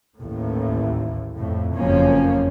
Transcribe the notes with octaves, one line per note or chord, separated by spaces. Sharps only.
A1 D#2 A2
F2 A2
F#1 F2 F3 A#3 C#4